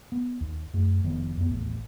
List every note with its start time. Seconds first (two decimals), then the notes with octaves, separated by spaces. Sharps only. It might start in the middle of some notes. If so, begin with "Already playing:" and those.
0.12 B3
0.41 D#2
0.73 F#2 A3
1.04 F1 D#3 F3 B3
1.37 F2 B3
1.50 A1 D#2 A2